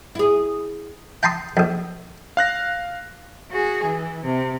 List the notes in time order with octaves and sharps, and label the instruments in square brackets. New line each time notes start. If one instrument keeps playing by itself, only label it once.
[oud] E4 G#4
[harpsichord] G5 A5 A#5 C6 D#6
A#1 F2
[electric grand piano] F5 F#6 A#6
[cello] F#4 G#4
E3
C3